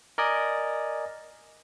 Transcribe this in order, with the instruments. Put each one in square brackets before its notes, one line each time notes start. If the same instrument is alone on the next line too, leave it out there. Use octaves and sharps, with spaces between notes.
[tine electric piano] A#4 D5 D#5 G#5